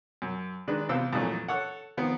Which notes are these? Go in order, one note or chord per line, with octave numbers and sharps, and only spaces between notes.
F#2
D#3 G#3 D4 B4
E2 C3 F4 C5 E6
F2 A#2 E3 F#3 A3
A4 C#5 F#5
D#3 F3 B3 C4